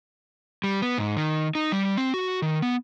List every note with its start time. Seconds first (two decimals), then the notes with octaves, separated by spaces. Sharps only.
0.64 G3
0.82 B3
0.98 G#2
1.17 D#3
1.55 D#4
1.72 G3
1.97 C4
2.14 F#4
2.42 D#3
2.62 B3